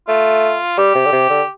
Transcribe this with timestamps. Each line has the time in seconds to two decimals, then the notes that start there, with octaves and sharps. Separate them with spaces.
0.08 A3 F4
0.78 G3 G4
0.95 C3
1.05 D3
1.12 C3
1.29 D3